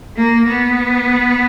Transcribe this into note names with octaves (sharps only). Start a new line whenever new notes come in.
A#3
B3